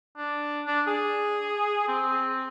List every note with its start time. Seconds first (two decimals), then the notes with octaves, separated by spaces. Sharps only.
0.17 D4
0.67 D4
0.87 G#4
1.88 C4